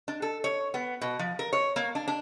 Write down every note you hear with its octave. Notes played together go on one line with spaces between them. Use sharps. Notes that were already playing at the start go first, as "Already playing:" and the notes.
D4
A4
C#5
B3
B2
F3
A#4
C#5
A#3
D4
D4